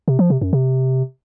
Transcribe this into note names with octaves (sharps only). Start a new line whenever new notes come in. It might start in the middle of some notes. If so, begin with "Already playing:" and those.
C3
F3
C3
F#2
C3